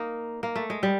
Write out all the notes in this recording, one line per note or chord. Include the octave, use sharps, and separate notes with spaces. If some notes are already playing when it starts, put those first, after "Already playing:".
Already playing: A#3 D#4
A#3
A3
G#3
G3